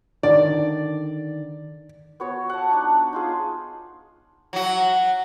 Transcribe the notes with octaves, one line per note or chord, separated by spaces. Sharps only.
D3 D#3 D5
B3 F#4 C#5
F#5 A5
D4 D#4 C#5
D#4 F4 G#4
F#3 F#4